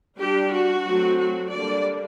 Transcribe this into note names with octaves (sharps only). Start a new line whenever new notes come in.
G3 D4 G4
F#4
F#3 A3 C4
F#4
D3 G3 A#3 D4 D5